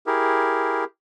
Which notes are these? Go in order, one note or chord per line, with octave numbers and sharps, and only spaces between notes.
E4 G4 G#4 A#4